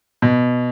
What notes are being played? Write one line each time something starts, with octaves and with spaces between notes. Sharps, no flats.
B2